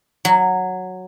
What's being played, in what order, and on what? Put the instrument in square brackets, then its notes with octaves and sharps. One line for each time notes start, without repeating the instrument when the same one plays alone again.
[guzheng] F#3